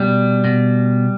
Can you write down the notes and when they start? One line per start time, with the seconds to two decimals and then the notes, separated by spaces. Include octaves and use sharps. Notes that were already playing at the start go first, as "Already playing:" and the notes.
Already playing: B2 G3
0.45 B2